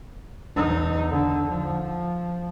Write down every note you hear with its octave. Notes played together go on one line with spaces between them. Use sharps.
E2 D#4
D3
F3